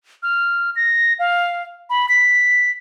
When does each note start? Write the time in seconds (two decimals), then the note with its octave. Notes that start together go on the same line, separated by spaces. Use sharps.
0.23 F6
0.76 A#6
1.19 F5
1.90 B5
2.09 B6